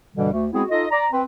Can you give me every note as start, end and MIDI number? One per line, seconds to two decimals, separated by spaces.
0.15 0.30 43
0.15 0.30 47
0.15 0.30 50
0.15 0.30 52
0.15 0.30 55
0.32 0.47 38
0.32 0.47 57
0.52 0.63 56
0.52 0.63 59
0.52 0.63 60
0.52 0.63 64
0.52 0.63 66
0.52 0.63 68
0.69 0.85 63
0.69 0.85 65
0.69 0.85 69
0.69 0.85 75
0.91 1.06 74
0.91 1.06 82
1.12 1.22 60
1.12 1.22 71